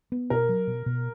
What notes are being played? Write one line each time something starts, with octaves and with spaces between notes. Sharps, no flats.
B3
B2 A#4
F#3
B2
B2